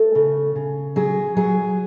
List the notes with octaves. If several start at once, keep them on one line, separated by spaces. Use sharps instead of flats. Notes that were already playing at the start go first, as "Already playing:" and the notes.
Already playing: A3 A4
C#3
C#3
F#3 G#4
F#3 G#4